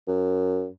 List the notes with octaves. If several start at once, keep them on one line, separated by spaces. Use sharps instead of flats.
F#2